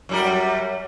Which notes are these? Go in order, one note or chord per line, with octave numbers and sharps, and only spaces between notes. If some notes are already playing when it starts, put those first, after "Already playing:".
F#2 G3 A#4